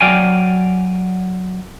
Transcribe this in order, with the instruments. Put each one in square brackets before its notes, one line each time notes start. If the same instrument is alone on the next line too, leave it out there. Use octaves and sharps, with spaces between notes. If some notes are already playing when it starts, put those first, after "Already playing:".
[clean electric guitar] F#3 D5 F5 G5 G#5